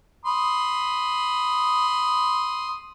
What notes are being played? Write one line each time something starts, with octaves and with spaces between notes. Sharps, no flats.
B5 C6 D#6